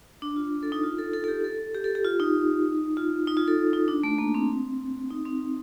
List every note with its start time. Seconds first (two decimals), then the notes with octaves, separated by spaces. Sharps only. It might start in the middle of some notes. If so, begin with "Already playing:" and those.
0.22 D4
0.36 F4
0.63 A4
0.72 D#4
0.83 F4
0.98 A4
1.14 A4
1.24 A4
1.28 G4
1.44 A4
1.75 G4
1.84 A4
1.95 G4
2.04 F4
2.20 D#4
2.97 F4
3.27 D#4
3.37 F4
3.48 A4
3.73 D#4
3.88 D4
4.03 A3
4.18 A#3
4.34 C4
5.10 D#4
5.26 C4